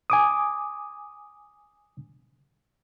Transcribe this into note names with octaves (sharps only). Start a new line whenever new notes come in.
G#5 D6 D#6